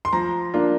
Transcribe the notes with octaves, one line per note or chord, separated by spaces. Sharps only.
C6
F3 A#5
A#3 D4 F4